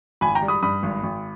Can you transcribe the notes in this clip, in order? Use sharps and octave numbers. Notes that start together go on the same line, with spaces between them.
G#1 G#5 B5
G5 A#5
G3
B5 D#6
G2 B5 D#6
G#1
G#1